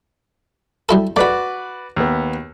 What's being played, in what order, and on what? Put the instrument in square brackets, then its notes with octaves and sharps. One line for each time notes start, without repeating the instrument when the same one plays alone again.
[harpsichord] G3 E4 A4
[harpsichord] A3 B5 [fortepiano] F#4 B4 D5
[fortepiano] D#2 B3